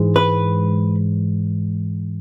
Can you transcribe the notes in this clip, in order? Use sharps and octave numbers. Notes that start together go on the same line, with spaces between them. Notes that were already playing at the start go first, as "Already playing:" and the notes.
Already playing: G#2 E3 G#3
B4